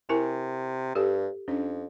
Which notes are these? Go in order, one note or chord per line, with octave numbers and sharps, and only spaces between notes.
C3 E4 A#4 G#5
G2 G4 A4
F2 C#4 D4